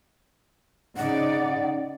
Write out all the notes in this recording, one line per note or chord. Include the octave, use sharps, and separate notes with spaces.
C#3 D#4 D5 F#5